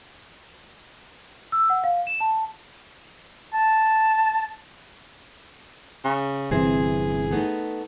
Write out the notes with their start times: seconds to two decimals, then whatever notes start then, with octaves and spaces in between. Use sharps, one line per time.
1.52 E6
1.70 F#5
1.84 F5
2.07 E7
2.20 A5
3.54 A5
6.05 C#3
6.51 G1 C3 E3 C4 G#4
7.31 A3 B3 D#4